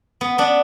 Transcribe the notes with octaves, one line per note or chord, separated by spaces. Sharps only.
B3
B3 D4